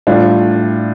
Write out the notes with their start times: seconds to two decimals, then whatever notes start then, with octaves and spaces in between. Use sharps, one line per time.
0.07 A2 G3 D4 F4